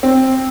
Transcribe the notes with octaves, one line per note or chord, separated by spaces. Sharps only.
C4